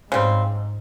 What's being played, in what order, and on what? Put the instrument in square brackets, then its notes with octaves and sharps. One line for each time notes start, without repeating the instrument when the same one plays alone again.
[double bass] G#2 [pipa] C#3 G3 C4